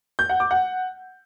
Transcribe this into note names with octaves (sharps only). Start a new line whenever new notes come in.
G6
F#5
D6
F#5